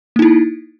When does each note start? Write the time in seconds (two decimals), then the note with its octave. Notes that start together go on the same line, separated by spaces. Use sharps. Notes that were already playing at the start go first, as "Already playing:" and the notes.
0.16 A#3
0.19 D#4
0.22 E4